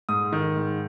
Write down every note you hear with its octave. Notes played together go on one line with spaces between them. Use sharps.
G#2 D#6
D#3
G#2